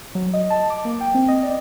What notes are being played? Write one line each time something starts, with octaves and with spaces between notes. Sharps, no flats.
F#3
D#5
A5
D6
A#3
G5
C4
D#5
D5